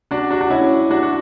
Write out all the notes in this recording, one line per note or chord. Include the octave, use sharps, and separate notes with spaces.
D4 F#4
D4 F#4
D4 F#4
C#4 E4
D4 F#4
F#4